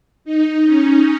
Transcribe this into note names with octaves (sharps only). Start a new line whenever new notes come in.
D#4
C#4